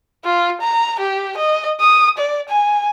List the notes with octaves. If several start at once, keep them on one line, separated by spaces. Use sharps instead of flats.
F4
A#5
G4
D#5
D#6
D5
G#5